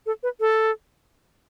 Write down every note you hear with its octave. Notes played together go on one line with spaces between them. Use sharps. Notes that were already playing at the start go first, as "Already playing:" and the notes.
A4
B4
A4